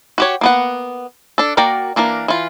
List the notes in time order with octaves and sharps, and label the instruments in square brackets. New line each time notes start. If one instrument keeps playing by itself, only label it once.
[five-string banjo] F#4 G4 C#5
A#3 B3 F#5
D4 A4
A#3 F#4 A#4 D5 G5
E3 A#3 D4 A#4
E3 F4